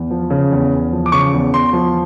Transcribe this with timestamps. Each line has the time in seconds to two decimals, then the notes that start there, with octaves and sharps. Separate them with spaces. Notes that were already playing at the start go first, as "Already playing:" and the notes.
Already playing: E2
0.11 F3
0.30 C#3
0.51 E2
0.72 E2
0.92 F3
1.06 D6
1.12 C#3 C#6
1.33 E2
1.53 E2 C6
1.73 F3